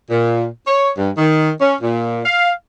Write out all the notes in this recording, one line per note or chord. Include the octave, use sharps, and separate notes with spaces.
A#2
C#5
G2
D#3
C#4
A#2
F5